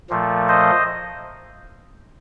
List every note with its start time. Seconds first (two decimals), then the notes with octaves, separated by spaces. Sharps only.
0.10 A#2 F3 A3
0.49 C5 D#5